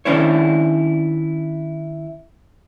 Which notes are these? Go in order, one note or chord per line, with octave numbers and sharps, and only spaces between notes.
D#3 C#4 D4 E4 C5 C#5